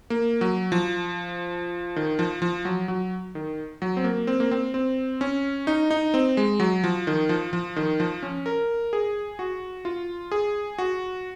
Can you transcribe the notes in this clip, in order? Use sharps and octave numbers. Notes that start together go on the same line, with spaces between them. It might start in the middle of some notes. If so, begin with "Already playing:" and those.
A#3
F#3
F3
D#3
F3
F3
F#3
F#3
D#3
F#3
C4
A#3
C4
A#3
C4
C4
C#4
D#4
D#4
C4
G#3
F#3
F3
D#3
F3
F3
D#3
F3
C#4
A#4
G#4
F#4
F4
G#4
F#4